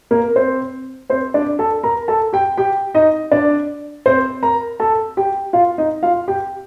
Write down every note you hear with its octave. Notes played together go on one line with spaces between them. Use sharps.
A#3 A#4
C4 C5
C4 C5
D4 D5
A4 A5
A#4 A#5
A4 A5
G4 G5
G4 G5
D#4 D#5
D4 D5
C4 C5
A#4 A#5
A4 A5
G4 G5
F4 F5
D#4 D#5
F4 F5
G4 G5